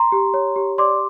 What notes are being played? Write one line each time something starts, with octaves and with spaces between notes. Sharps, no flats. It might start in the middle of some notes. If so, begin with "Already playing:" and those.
Already playing: A#5 C6
G4
C#5
G4
D5 C6 D6